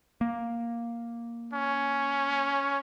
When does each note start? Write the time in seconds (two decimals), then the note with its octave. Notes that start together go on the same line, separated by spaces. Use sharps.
0.21 A#3
1.53 C#4